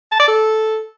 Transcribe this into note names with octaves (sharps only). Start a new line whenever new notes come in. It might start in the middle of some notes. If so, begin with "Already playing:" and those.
A5
D5
A4